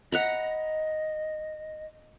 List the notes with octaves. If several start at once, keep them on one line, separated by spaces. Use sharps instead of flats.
D#5 F#5 A#5 B5